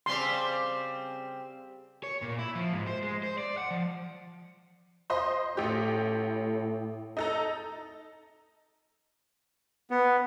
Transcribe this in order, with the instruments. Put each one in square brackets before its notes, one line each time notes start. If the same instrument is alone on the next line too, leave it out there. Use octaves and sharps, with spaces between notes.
[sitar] C#3 G3 C4 [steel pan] C6
[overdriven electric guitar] C#5
A#2
E4
F3
G#2
C5
G#3
C5
D5
F#5
F3
[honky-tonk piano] C5 D#5 C6
[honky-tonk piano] A1 G4 [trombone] A2
[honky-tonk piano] D#4 A4 A#5
[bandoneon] B3